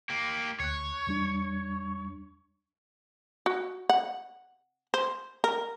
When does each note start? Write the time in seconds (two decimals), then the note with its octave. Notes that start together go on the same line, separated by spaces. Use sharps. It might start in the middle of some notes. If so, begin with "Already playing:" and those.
0.10 A#3 G4
0.60 D2 C#5 F#6
1.07 E2 G3 D4
3.46 F#4
3.89 F#5
4.94 C5
5.44 A#4